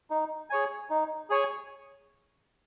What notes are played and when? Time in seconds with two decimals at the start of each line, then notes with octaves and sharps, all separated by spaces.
0.10 D#4
0.50 G#4 C#5 G#5
0.90 D#4
1.30 G#4 C#5 G#5